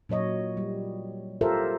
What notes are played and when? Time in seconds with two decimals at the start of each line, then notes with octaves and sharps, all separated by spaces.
0.09 A#2 F#3 C#5 D#5
0.57 G3
1.41 F4 G4 A4 A#4 C5 E5